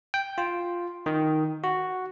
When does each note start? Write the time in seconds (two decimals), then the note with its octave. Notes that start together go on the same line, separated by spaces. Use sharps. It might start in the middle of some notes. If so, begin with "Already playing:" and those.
0.14 G5
0.38 F4
1.06 D#3
1.64 F#4